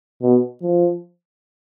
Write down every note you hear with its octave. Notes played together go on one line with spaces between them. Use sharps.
B2
F3